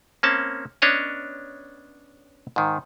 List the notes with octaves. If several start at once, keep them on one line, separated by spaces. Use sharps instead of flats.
A#3 C4 C#4 A5
B3 C#4 D4 C#5 D#5
G#2 D#3